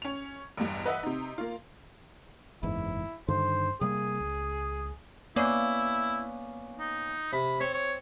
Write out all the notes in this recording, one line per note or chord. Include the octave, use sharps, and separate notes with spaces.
C#4 F7
A1 E2 G2
B4 D#5 E5 F#5
C3 D#4
A#3 F4
F#1 E2 G#2 E4
G2 D3 D#3 C5
C3 G3 A#3 G#4
C#2
A#3 B3 C#4 E4 D5
D#4
C3 B5
C4 C#5
C#5